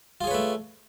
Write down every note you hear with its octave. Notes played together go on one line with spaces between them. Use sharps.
A3 F4 G#4 B4 C#5